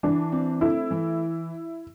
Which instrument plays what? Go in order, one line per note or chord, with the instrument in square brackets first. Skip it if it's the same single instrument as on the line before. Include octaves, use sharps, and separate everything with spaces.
[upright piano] E3 [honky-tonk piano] D4
[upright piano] C4
[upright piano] A3 [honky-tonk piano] E4
[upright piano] E3